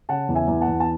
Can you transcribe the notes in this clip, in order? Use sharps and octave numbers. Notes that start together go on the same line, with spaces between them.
C#3 F#5 A5
E2
E5 G#5
E2
F#5 A5
E2
A5